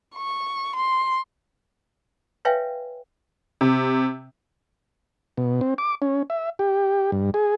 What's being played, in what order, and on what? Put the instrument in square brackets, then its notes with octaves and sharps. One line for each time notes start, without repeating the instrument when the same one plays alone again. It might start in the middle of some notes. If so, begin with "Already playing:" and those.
[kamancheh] C#6
C6
[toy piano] B4 C#5 E5 F5 G5 G#5
[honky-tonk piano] C3
[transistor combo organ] B2
C4
D6
C#4
E5
G4
G2
G#4